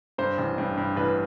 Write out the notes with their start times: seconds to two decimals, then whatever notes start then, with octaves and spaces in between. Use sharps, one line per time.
0.18 G2 C5
0.38 A1
0.58 G2
0.77 G2
0.96 A1 B4